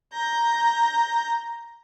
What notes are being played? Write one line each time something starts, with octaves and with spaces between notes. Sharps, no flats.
A#5 G6 A#6